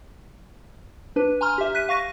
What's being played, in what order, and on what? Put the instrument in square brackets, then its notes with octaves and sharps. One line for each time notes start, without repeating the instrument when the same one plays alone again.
[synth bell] D4 B4
G#5 A#5 C6 F6
G4 E5
F#6 B6 D#7
F5 C#6 A#6 D#7